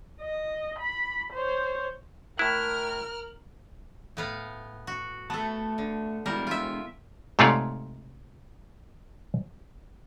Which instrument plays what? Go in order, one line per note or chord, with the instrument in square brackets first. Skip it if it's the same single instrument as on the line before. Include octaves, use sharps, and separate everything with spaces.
[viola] D#5
B5
C5 C#5
[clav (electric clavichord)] A2 E4 [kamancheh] A#4 F6 [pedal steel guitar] F#6
[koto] A2 B3 F5
F#4
[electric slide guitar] A3 A5 [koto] B3 A4
[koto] D3
[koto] G3 A#4 [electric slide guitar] G#3 B3 E4
[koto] F4 E5
[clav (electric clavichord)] G#2 C3 A3 F4 C#5 D5